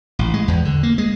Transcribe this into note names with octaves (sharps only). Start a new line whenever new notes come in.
A1
G#3
E2
D3
A#3
G#3